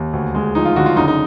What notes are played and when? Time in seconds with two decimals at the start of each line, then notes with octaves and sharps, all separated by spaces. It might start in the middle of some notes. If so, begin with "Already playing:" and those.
Already playing: D#2
0.13 D2
0.35 G#3
0.55 F3 D#4
0.65 F4
0.76 D3 F#4
0.86 F4
0.97 F#1 D#4
1.08 D#4